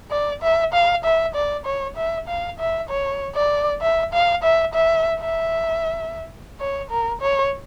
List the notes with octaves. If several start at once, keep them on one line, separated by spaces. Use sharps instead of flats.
D5
E5
F5
E5
D5
C#5
E5
F5
E5
C#5
D5
E5
F5
E5
E5
E5
C#5
A#4
C#5